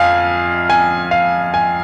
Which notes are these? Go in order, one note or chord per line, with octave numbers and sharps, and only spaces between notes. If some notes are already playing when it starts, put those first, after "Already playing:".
Already playing: F2 F5 G#5
G#5
F5
G#5